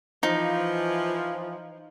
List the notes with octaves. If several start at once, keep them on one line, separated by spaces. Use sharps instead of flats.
E3 F3 D#4